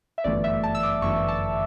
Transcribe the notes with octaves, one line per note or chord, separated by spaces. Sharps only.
E5
G1 F#2 E3 A3 D5
E5
A5
E6
D6
G1 F#2 E3 A3 C#6
A5